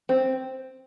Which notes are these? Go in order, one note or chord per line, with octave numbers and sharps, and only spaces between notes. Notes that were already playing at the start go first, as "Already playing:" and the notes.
C4